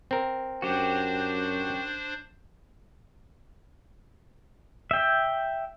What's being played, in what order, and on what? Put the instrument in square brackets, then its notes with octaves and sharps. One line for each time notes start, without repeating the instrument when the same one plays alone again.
[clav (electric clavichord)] C4 A#4
[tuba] F#2 [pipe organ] D4 C5 [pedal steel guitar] F#4 G4
[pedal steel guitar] E5 G5